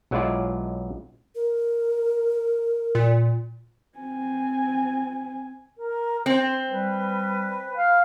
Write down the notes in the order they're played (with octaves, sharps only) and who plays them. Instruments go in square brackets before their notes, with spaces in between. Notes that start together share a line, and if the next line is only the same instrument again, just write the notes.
[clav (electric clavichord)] B1 F#3 G#3 E4 F4 D5
[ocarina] A#4
[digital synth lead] A#2
[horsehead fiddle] C4 G#5
[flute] A#4
[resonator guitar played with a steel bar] C4 [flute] C5
[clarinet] G3 [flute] B4
[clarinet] F5